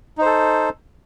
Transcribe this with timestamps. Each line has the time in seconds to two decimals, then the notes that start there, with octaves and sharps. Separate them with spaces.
0.18 D#4
0.22 C5
0.26 A4